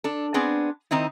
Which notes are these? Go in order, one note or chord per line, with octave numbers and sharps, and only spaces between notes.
D4 A4
B3 C4 D4 G#4
D#3 C4 D#4 E4